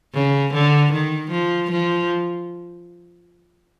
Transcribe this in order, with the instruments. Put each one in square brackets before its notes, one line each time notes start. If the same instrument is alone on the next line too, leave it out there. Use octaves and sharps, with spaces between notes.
[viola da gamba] C#3
D3
D#3
F3
F3